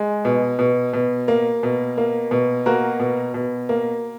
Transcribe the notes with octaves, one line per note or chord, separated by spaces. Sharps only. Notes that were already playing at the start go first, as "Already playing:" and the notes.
Already playing: G#3
B2
B2
B2
A#3
B2
A#3
B2
A#3 F#4 A#4
B2
B2
A#3